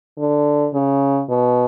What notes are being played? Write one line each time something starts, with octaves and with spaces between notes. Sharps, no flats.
D3
C#3
B2